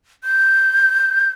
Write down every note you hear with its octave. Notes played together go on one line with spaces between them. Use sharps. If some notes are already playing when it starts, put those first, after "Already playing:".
G6